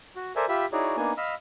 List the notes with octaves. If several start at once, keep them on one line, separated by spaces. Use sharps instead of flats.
F#4
A4 A#4 C5 D5 E5 G#5
F4 G4 E5 B5
D#4 E4 F#4 G#4 C#5 D5
A#3 B3 D4 D#4 G#5
D#5 F5 B5 E6 F6